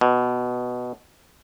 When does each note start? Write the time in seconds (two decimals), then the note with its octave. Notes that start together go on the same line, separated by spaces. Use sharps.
0.01 B2